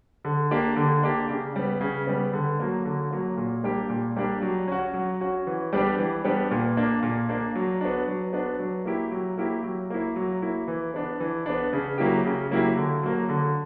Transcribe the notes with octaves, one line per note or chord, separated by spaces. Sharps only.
D3
A#3 D4 G4
D3
A#3 D4 G4
C#3
G3 B3
C#3
G3 B3
D3
F#3 A#3
D3
F#3 A#3
A#2
G3 A#3 D4 G4
A#2
G3 A#3 D4 G4
F#3
C#4 F#4
F#3
C#4 F#4
E3
G3 B3 D4 G4
E3
G3 B3 D4 G4
A#2
A#3 D4
A#2
A#3 D4
F#3
B3 D4
F#3
B3 D4
F#3
A#3 E4 G4
F#3
A#3 E4 G4
F#3
A#3 E4
F#3
A#3 E4
E3
B3 D4
E3
B3 D4
C#3
F#3 A#3 E4 G4
C#3
F#3 A#3 E4 G4
D3
F#3 A#3
D3